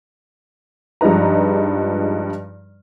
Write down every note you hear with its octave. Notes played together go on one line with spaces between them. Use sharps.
G2 F3 G#3 D#4 B4 A#5